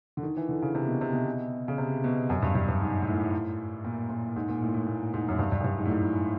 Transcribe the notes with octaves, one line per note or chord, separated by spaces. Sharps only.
D3
D#3
E3
D3
C#3
C3
B2
C3
B2
C#3
C3
B2
F#2
G2
G2
G2
G#2
G#2
A2
A#2
A#2
G#2
A#2
A2
A2
A#2
G#2
F#2
G2
G2
F#2
G2
G#2
A2
G#2